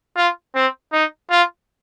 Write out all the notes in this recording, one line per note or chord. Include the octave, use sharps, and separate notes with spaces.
F4
C4
D#4
F4